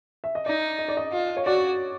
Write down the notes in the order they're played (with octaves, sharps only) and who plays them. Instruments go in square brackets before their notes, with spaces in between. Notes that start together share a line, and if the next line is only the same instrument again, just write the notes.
[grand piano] E5
D#5
[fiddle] D#4 [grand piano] D5
[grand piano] D#5
D5
D#5
[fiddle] F4
[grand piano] C#5
[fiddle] F#4 [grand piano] D5